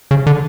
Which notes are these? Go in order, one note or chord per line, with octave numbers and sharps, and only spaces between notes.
C#3
D3